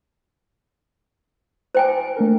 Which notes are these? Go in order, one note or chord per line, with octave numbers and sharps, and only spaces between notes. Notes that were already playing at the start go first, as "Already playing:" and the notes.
C5 G5 G#5
A3 D4 A#4